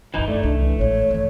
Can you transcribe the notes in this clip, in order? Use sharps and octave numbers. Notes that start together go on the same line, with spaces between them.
F#1 G2 E3 D#4
A3 D5
C2 D4
E3
A1 G#3 C#5
G2 E3